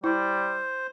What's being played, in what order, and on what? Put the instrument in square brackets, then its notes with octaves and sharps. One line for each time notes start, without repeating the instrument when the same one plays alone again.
[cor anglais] G3 [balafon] E4 [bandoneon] C5